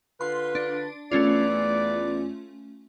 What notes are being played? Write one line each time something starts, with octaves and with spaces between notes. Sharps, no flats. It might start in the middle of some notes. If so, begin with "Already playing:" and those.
D3 F4 B4 C6
D4
E2 A3 C#4 F4 B4 D5